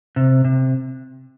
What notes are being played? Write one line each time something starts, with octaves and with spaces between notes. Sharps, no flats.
C3
C3